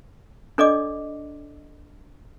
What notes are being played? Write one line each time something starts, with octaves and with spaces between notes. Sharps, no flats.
D4 A4 D5 D#5 D6